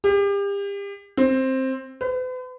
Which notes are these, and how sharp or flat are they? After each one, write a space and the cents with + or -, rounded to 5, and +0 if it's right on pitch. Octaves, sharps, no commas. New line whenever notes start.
G4 +35
C4 +10
B4 +45